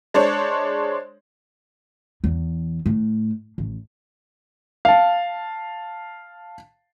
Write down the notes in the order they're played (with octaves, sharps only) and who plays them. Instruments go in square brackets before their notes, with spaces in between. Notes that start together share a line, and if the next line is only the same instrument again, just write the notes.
[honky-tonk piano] G#3 D4 C5 C#5
[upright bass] E2
A2
A1
[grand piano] F5 A5